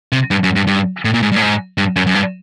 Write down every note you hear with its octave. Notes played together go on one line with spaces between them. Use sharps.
C3
G2
F#2
G2
G2
A2
A#2
G#2
G2
A2
G#2
G2
F#2
F#2
G2